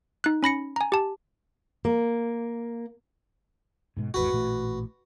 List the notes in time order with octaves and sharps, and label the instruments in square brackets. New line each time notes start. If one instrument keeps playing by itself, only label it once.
[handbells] D#4 F#6
C#4 B5 A#6 C#7
G#5 A#5
G4 A5
[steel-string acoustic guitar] A#3
[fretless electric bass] G#2 B2 G#3
[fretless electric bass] G#1 E2 G#2 [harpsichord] F#4 B4
[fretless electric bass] A1 A#2 A3